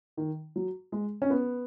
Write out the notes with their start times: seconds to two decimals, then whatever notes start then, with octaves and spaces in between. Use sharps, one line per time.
0.17 D#3
0.56 F#3
0.92 G#3
1.22 C#4
1.30 B3